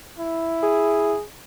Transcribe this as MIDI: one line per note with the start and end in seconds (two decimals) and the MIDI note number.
0.19 1.13 64
0.63 1.22 68